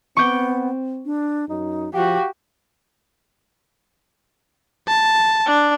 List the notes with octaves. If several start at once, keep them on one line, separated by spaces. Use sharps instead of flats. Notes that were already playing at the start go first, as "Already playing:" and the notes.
B3 C4 C#6 D6 G6
D4
F#2 D#4
F3 F#4 G4 F5
A5
D4